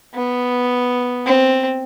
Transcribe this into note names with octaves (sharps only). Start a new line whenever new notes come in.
B3
C4